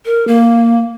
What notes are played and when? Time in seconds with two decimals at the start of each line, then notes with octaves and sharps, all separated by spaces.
0.06 A#4
0.28 A#3